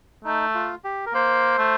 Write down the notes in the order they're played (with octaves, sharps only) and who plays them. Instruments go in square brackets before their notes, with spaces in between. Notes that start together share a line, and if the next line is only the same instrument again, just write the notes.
[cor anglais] A3 [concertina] D#4
[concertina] F4
G4
A#4
[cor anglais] A#3 [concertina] C5
[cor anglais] A3